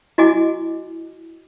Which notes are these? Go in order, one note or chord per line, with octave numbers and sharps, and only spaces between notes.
E4 F#4 D#5 G#5 D6